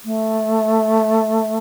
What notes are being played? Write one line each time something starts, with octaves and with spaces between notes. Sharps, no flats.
A3